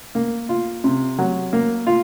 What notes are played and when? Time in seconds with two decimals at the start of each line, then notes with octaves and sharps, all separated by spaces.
0.15 A#3
0.49 F4
0.84 C3
1.19 F#3
1.53 A#3
1.87 F4